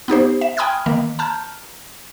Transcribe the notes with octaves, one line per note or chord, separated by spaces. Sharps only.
B3 D#4 G4 C5
E5
G5 G#5 B5 D#6 F6 G#6
D#3 A#3
A5 A#5 F6 G6